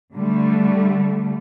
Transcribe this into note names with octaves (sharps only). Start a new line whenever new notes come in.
D3 G3 A3